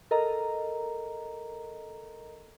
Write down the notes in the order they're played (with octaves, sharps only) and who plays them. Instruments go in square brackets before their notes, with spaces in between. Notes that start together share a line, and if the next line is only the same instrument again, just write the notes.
[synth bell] A4 A#4 D#5 A#5